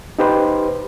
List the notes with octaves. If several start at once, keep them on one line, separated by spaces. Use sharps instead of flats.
D#4 G4 B4 C5